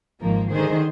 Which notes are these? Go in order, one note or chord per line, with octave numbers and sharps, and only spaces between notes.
G#1 G#2 D#3 F3 A#3
D3 D#3 G#3 D#4 G#4 C5